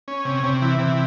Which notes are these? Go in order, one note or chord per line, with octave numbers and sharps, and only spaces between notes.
C#4
C3
C3
E3
C3